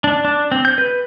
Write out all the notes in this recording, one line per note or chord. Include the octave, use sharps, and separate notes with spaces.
D4
D4
C4
G6
B4